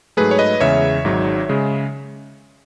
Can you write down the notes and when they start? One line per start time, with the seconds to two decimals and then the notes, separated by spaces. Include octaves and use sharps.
0.17 G#2 F#3 A3 G#4 B4
0.31 C#5
0.39 B4 D#5
0.60 E2 C#3 G#3 C#5 E5
1.04 G#1 G#2 F#3
1.49 C#3 G#3